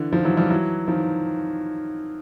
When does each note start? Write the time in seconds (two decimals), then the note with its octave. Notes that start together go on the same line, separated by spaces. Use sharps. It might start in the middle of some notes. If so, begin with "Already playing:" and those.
Already playing: D3 E3
0.13 D#3 F3
0.25 E3 F#3
0.37 F3 G3
0.50 E3 F#3
0.88 D#3 F3